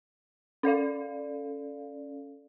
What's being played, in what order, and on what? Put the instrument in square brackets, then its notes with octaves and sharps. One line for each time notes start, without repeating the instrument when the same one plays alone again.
[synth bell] C#4 A4 D5 F5